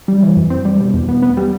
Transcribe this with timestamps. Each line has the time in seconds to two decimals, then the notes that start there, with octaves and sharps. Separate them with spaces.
0.08 G3
0.22 E3
0.37 F#2
0.50 C4
0.65 G3
0.80 B2
0.93 E2
1.08 B3
1.22 B3
1.37 G3